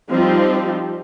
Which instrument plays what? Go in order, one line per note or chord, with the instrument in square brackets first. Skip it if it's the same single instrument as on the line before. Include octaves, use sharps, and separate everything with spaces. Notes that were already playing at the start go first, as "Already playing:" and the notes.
[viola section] F3 G3 C4 D#4 F4 G4